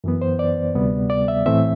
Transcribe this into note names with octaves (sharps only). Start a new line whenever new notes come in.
F#2 E3 B3
C5
D5
D2 C3 G3 B3
D5
E5
A2 E3 A3 C4 E5